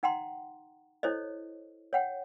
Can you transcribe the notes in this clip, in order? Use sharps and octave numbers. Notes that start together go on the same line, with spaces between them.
D#4 F#5 G5 A#5 C6
E4 A4 C5 C#5 D#5
C#5 F#5 G5